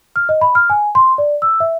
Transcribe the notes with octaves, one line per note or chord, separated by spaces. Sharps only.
F6
D#5
B5
F6
G#5
C6
D5
E6
E5